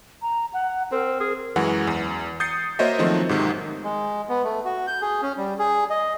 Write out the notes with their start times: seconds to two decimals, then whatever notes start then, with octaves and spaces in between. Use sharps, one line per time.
0.22 A#5
0.53 F#5
0.92 C4 A#4
1.20 G#4
1.56 F#2 E3 G#3 F#5
1.87 E2
2.40 D#6 G6 A6 C7 C#7
2.79 A#3 F#4 C5 C#5 D#5 E5
2.99 D#3 F3 F#3 A3 C4
3.29 G#2 C3 D#3
3.84 G#3
4.29 B3
4.44 A3
4.65 F#4
4.87 G6
5.02 G#4
5.22 C#4
5.38 G3
5.59 G#4
5.90 D#5